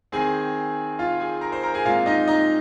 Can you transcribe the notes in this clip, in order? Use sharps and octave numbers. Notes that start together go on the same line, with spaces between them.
D#3 C4 G#4 G#5
F4 F5
G#4 G#5
A#4 A#5
C5 C6
A#4 A#5
G#4 G#5
A#2 G#3 C4 F4 F5
D#4 D#5
D#4 D#5